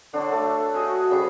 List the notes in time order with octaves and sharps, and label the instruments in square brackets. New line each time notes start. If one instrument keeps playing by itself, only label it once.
[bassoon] D3 [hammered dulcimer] D4 F#4 [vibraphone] C#5
[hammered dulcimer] A3 [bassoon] A4
[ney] F#4 [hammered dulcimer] G#4 D#5
[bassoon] C#3 [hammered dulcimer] G3 [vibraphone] A4 C5 C#5